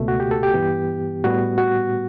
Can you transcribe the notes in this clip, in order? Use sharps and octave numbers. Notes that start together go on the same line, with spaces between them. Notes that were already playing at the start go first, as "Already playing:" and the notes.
Already playing: C#2 B2 A3
F#4
G4
A4
G4
G2 E3 B3
A2 G3 B3 F#4
F#4